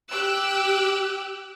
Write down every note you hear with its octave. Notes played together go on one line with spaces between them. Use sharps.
G4 G5 D6 E6 F#6